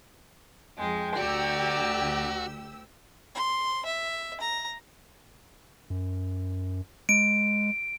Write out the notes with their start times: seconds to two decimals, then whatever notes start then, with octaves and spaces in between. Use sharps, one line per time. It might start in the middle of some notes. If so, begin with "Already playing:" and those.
0.78 F2 G#3 G5
1.17 D2 F#4 G4 D5 A#5 E6
3.35 C6
3.85 E5
4.40 A#5
5.90 F#2
7.09 G#3 D7